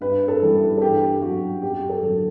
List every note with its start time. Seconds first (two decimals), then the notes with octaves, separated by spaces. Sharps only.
0.01 G2 B4
0.28 A4
0.41 E3 G3
0.78 A4
0.82 G2 G4
1.22 F#3 F#4
1.62 F#2 G4
1.89 A4
2.03 D3 F#3